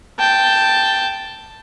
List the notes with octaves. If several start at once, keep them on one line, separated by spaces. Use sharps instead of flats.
G5 A5